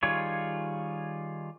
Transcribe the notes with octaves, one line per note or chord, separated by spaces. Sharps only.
D#3 G3 F4 G#4 C#5